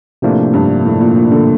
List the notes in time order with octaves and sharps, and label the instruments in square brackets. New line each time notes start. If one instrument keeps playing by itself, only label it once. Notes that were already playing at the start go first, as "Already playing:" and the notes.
[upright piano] A2 [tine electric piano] C3 F3 A#3 D4
[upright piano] G2
A2
A#2
A#2
D3